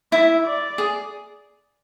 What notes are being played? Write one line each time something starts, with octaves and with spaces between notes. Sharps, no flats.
E4 E5
D5
G#4